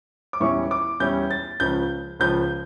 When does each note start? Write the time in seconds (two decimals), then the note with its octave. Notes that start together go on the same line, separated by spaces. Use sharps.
0.33 D6
0.40 E2 E3 G3 C#4 E4 C#6
0.71 D6
1.00 E2 E3 G3 C#4 E4 G6
1.31 A6
1.60 C#2 C#3 F3 G6
2.19 C#2 C#3 F3 G6